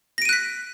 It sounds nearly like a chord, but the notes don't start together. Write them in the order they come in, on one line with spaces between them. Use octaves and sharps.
A#6 D7 D#7 F#6 B6